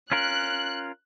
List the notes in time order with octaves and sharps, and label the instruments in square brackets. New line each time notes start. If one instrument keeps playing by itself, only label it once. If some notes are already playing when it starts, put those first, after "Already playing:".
[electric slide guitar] C#4 F4 A#4 [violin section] F#6